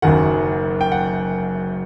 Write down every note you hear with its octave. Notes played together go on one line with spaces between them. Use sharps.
F#1 F#2 D#3 F#5
G5
F#5